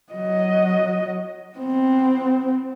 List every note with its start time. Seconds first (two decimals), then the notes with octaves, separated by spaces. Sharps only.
0.13 F#3 D#5
1.57 B3 C4